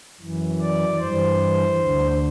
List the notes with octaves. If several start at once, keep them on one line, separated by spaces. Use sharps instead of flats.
F#2 E3
D5
G2 E3 C5
D2 D3